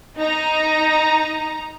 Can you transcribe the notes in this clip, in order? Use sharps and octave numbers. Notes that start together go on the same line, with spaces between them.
D#4 A#5